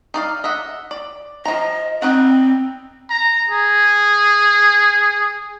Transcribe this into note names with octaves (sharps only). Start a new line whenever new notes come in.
D#4 D5 F5
D#5 E5 F#5
D5
F3 D#5 A#5
G3 C4 D#4 F#5
A#5
G#4